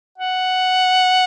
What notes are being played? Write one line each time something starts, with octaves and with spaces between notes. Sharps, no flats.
F#5